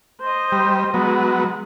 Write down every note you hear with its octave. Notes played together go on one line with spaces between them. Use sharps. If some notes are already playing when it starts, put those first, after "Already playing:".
C5 D#5
G3
F#3 G#3 B3